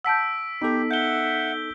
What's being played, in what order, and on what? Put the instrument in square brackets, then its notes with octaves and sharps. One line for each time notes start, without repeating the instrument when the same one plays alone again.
[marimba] F#5 A5 G6 [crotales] E6 B6 D7
[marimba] B3 [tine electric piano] D#4 A4 [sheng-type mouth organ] G4
[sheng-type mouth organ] E5 F#5 [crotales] G6 G7